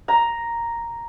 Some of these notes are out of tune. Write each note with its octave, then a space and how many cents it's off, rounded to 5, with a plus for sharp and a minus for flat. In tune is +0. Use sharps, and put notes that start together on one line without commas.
A#5 +0